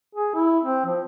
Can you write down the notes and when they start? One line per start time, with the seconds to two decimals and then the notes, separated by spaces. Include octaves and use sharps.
0.15 G#4
0.35 E4
0.63 C4
0.86 F3